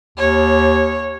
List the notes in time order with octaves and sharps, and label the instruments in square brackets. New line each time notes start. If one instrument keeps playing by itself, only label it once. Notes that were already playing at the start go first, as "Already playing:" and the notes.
[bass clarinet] D#2 [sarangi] C#5